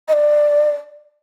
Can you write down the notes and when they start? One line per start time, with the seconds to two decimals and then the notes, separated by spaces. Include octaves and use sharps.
0.08 D#5
0.13 D5